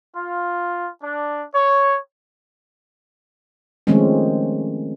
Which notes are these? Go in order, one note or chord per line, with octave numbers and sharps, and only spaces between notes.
F4
D4
C#5
D#3 F3 G#3 A3 C4 C#4